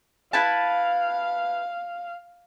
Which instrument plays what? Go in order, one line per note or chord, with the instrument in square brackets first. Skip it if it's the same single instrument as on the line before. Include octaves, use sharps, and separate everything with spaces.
[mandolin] E4 B4 A5 [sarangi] F5